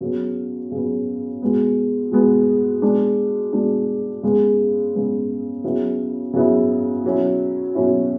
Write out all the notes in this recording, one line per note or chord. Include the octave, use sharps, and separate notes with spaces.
C#3 F#3 B3
C#3 F#3 B3
B2 G#3 B3
B2 G#3 B3
B2 G#3 D4
B2 G#3 D4
C#3 G#3 B3
C#3 G#3 B3
C#3 F#3 B3 E4
C#3 F#3 B3 E4
B2 F#3 C#4 E4
B2 F#3 C#4 E4